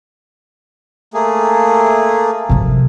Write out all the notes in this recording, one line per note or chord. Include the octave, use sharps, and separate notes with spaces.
A3 A#3 G#4
C3 F3